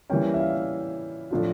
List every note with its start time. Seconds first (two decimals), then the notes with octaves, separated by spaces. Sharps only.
0.10 E3 G3 A#3 C#4 G5
0.34 E5
0.40 F5
1.31 A2 F3 A3 D4 F4